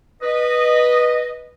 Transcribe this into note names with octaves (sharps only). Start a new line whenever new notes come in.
B4 D#5